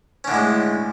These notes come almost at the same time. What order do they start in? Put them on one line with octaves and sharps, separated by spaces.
C#4 D3 A2 G#3